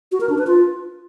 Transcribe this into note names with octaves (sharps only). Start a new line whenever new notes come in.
F#4
A#4
D4
B4
F4